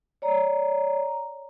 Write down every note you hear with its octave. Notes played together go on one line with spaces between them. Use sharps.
C#5 D5 A#5